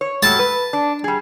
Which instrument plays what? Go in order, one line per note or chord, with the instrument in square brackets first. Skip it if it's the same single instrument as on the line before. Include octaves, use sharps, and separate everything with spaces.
[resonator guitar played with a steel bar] C#5
[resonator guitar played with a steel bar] F#3 G3 A3 [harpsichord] A5
[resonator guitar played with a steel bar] B4
D4
G3 G#4